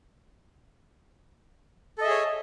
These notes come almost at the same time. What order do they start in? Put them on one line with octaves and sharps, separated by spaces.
A4 D#5 E5 G#4 C#5